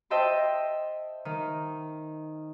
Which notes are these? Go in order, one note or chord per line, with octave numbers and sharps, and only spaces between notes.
C5 D#5 E5 G5 A5 C6
D#3